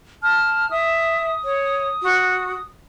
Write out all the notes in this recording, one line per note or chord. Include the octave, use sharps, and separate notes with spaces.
A5 F6
E5 D#6
C#5
F#4